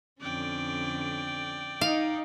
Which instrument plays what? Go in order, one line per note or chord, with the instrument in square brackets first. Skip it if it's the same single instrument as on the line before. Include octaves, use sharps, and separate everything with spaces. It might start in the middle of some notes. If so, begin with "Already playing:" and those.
[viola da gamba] F2 D3 C#4 [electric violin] D5 G5
[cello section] D#4 [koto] F5